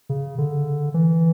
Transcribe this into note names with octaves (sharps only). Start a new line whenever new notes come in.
C#3
D3
E3